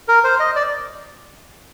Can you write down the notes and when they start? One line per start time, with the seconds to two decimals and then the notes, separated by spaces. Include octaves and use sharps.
0.08 A#4
0.24 C5
0.40 D#5
0.55 D5